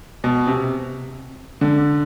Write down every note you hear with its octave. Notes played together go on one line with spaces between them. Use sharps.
B2
C3
D3